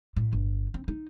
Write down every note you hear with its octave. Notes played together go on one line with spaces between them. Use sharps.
A2
G1
C4
D#4